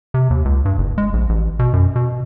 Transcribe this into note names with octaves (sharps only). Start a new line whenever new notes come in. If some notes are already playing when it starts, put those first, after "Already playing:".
C3
D#2
C#2
G2
F#1
G#3
A#1
A1
B2
F#2
B2